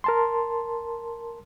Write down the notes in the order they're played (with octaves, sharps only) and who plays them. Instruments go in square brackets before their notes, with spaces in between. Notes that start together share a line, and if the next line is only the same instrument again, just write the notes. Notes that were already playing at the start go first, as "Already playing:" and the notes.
[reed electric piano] A#4 A5 C6